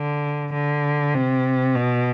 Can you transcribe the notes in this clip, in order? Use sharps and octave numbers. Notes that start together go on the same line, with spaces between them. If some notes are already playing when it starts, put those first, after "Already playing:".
Already playing: D3
D3
C3
B2